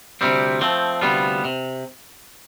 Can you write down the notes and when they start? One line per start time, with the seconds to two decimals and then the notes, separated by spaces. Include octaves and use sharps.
0.21 D2 C3 G3 C4
0.61 F3 A3 C4
1.01 D2 C3 G3 B3 F4
1.45 C3